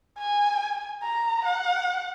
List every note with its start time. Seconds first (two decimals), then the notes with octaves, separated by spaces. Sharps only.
0.19 G#5
1.03 A#5
1.45 F#5